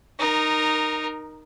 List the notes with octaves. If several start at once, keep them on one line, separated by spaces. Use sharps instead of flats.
D#4 A#4